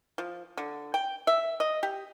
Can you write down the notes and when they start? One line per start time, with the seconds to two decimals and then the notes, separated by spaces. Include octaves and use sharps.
0.18 F3
0.57 D3
0.94 G5
1.27 E5
1.60 D#5
1.83 G4